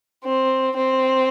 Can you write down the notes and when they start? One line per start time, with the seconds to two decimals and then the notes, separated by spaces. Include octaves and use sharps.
0.24 C4
0.76 C4